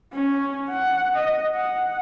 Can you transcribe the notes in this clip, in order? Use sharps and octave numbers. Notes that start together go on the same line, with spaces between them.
C#4
F#5
D#5
F#5